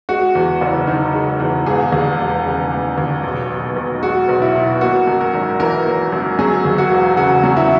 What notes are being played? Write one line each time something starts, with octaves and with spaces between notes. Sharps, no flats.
G#3 F#4
E2
F#1
D#3
G#3
E2
E1 G#4
D#2
E1
C#3
E1
D#2
B1
B2
B1
G#3 F#4
B1
E4
B2
A#3 F#4
F#2
A#4
G#1
E3 A#4
A#3
F#2
F#3 G#4
D#2
F#4
E1
C#3 F#4
F#3
E4